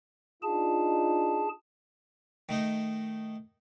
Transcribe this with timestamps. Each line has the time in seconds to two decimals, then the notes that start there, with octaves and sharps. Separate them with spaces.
0.43 D4 D#4 F4 G#4 A5
2.49 D#3 A3 D#4